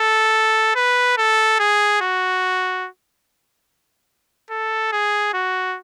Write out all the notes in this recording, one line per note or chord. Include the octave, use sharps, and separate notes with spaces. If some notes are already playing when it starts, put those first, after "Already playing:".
Already playing: A4
B4
A4
G#4
F#4
A4
G#4
F#4